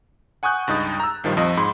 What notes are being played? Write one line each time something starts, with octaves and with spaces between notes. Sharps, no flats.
F#5 G#5 C#6 D#6 F#6 G6
C#2 G2 D#4 D#6 A6
A#5 E6
A#1 D#3 F3 G3
F2 F3 D#5 D#6
G#2 B5 C6